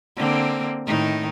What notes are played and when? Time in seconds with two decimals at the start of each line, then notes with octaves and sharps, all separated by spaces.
0.17 D3 A#3 C4
0.87 A2 D#3 D#4